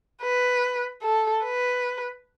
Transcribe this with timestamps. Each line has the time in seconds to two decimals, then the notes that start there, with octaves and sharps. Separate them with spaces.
0.22 B4
1.02 A4
1.44 B4